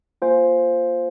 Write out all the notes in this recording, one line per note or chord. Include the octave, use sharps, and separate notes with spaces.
A#3 F4 C5 F5 G#5